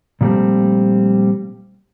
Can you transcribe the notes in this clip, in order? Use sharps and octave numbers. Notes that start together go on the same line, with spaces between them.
A#2 F3 G3 A3 C4